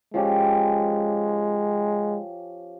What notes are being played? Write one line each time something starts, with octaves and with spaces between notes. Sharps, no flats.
F3 G#3 C#4 G4